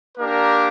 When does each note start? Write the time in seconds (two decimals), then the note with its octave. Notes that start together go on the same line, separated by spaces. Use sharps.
0.18 A#3 D4 G4 A#4